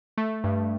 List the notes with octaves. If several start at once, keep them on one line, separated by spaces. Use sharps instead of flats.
A3
G2